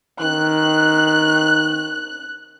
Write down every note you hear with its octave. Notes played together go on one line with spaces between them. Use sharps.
D#3 F#6